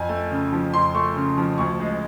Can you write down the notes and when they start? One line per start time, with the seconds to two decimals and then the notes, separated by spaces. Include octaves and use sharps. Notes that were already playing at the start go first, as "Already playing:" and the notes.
Already playing: F2 G#5
0.09 A3
0.31 C#3
0.52 F3
0.74 F2 C6
0.95 A3 C#6
1.16 C#3
1.38 F3
1.58 D2 C#6
1.80 G#3